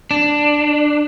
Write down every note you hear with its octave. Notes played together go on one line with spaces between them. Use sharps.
D4